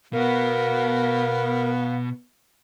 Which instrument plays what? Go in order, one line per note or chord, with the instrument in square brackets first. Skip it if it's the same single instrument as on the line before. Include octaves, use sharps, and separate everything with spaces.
[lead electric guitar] B2 F#4 [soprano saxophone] B3 [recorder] A#4 [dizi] F5